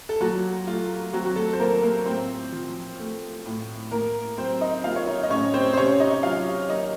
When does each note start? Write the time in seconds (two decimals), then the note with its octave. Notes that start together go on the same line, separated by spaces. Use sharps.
0.09 A4
0.20 A#2 F#3 F#4
0.67 A3 F4
1.13 F#3 C4 F#4
1.25 F#4
1.36 A3 A4
1.53 C5
1.60 A#2 A#3 A#4
1.83 A#3 A#4
2.05 A2 C4 C5
2.52 F3
2.99 A3
3.46 A2
3.91 A2 A#3 A#4
4.38 F#3 C4 C5
4.61 D#4 D#5
4.84 A#3 F4 F5
4.96 C#5
5.07 D#4 D#5
5.23 D#5
5.30 A2 C#4 C#5
5.54 C4 C5
5.73 C5
5.77 C3 C#4 C#5
6.00 D#4 D#5
6.23 F#3 F4 F5
6.69 A#3 D#4 D#5